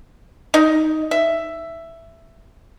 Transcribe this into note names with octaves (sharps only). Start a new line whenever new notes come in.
D#4
E5